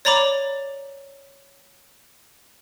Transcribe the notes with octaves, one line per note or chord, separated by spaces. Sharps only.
C#5 D5 A#5 B5 D6